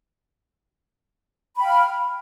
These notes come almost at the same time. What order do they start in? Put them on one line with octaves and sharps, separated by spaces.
B5 G5 F5 F6